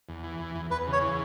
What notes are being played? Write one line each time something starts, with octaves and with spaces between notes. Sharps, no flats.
E2
E3
E2
E2
E2 B4
C#3
C#5
E3